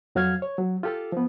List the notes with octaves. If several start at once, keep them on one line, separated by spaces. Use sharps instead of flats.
F2 F#3 F#4 F5 F6 G#6
C#5
F#3
F4 G4 A4
F3 B3